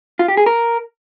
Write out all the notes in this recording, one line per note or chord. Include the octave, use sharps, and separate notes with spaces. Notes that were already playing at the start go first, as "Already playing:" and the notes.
F4
G4
G#4
A#4